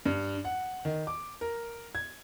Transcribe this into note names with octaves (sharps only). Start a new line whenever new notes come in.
G2
F#5
D#3
D6
A#4
G#6